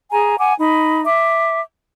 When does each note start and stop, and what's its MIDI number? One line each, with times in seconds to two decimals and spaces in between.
0.11 0.38 68
0.11 0.38 80
0.11 0.38 82
0.39 0.53 78
0.39 0.53 80
0.39 0.53 86
0.59 1.04 63
0.59 1.04 83
1.05 1.61 76
1.05 1.61 86